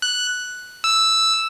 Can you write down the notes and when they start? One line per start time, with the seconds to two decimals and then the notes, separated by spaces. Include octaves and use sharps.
0.02 F#6
0.84 E6